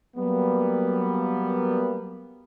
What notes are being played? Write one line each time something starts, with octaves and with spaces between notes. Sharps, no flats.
F#3 G3 A#3 B3